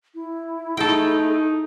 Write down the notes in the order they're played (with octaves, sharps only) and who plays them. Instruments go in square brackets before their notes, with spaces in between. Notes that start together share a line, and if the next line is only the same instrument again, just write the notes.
[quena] E4
[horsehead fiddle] A3 G#4 [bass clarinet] D#4 [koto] A4 G5